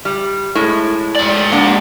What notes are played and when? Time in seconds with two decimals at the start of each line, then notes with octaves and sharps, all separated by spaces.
0.05 G3
0.55 A2 G#3
1.16 G#2 D5
1.52 A#3 D4 F#5